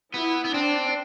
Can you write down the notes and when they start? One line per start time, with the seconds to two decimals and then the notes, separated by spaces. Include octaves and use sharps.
0.14 B3 E4
0.45 B3
0.54 C4 D4